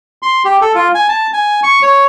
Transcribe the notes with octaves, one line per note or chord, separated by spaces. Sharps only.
C6
G4
A4
F4
G#5
A5
G#5
C#6
C#5